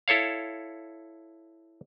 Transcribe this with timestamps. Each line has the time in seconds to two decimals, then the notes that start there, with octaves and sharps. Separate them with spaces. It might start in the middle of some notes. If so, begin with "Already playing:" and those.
0.08 E4 A4 C#5 F5